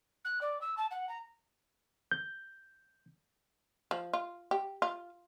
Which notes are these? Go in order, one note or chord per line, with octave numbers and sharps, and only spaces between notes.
F#6
D5
E6
A5
F#5
A#5
G6
F3
F4
G4
F4